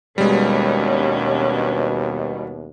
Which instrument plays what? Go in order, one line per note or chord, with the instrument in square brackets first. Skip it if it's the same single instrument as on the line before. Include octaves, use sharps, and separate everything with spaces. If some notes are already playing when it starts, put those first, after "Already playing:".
[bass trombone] D#2 [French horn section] B2 [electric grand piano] G3 G#3 [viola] C#4 D4